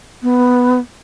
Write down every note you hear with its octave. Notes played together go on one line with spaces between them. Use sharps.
B3